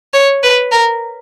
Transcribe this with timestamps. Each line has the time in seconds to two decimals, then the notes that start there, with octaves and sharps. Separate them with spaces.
0.14 C#5
0.43 B4
0.72 A#4